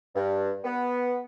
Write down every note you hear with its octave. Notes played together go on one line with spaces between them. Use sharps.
G2
B3